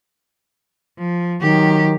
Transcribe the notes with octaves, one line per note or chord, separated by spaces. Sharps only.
F3
D#3 F#3 G4